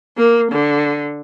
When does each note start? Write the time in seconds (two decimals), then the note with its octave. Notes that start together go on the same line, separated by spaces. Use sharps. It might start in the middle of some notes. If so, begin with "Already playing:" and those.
0.17 A#3
0.52 D3